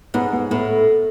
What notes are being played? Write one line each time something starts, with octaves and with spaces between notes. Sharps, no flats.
G#2 B3
B3
A2 B3